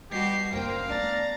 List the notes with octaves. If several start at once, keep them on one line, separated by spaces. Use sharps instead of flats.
B2 G3 F#4 G4 C7
F#1 A#3 C4 D4 F5 G5
A3 B3 D4 A#5 A6